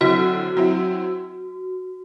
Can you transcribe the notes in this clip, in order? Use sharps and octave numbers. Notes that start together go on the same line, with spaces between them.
D3 F#3 C4 E4 F#4
F#3 C4 E4